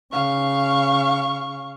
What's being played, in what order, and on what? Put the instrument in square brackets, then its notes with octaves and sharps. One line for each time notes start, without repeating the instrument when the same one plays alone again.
[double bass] C#3 [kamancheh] F5 C#6